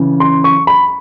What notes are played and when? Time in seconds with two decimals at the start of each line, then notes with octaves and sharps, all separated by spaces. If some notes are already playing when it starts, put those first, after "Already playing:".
Already playing: C#3 E3
0.20 C6
0.44 C#6
0.67 B5